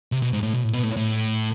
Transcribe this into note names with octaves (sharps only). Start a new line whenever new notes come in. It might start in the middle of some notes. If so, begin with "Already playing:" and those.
C3
B2
G#2
A2
B2
A2
B2
A2
A2